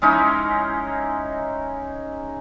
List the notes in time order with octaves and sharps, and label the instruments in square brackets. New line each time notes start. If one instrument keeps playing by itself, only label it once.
[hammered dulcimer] G#3 C#4 D#4 E4